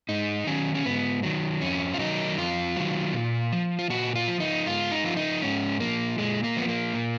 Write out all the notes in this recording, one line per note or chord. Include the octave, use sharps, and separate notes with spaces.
G#2 D#4
D#3 F#3 C#4
C#4
G#2 B3
D#3 F#3
F2 C#4
F4
D#3 F#3 D#4
F2 F4
D#3 F#3
A#2
F3
F4
A#2 F#4
F4
F3
D#4
G#2 F4
D#4
F3 F4
D#4
G#2 C#4
F3 A#3
A#2 G#3
A#3
F3 B3
A#3
A#2